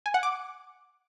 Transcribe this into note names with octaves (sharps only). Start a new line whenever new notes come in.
G#5
F#5
D6